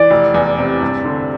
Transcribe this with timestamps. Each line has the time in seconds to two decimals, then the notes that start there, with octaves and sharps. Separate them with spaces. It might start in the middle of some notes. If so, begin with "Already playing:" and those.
Already playing: E3 D5
0.11 F1
0.34 E2
0.58 C3
0.82 G2
1.05 D3